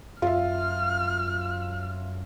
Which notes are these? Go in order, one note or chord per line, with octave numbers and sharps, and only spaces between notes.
F#2 F4 E5 F6